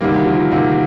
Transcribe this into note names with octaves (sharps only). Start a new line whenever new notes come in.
D2 C3 D#3 G3 A#3
F3
D2 C3 D#3 A#3